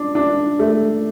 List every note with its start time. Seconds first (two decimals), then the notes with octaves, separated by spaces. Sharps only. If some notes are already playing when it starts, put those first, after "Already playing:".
Already playing: D4
0.15 D4
0.59 A3